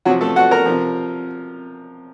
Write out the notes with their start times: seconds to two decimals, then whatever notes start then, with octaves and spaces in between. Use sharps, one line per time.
0.05 C3 F3 F#3 F#4
0.21 A3 A4
0.36 F#4 F#5
0.51 A#4 A#5
0.66 C3 F3